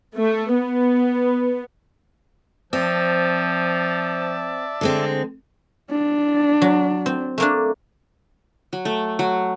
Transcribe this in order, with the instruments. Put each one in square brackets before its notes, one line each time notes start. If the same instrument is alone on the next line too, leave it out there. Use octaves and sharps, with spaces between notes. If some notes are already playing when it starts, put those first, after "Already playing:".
[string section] A3
B3
[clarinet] F3 [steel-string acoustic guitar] C4 [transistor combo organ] D5 E5 A5
[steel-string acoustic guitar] D3 G#3 C4
[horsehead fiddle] D4
[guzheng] F#3
C4
A3 A#3 D4
[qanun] F#3
A3
F#3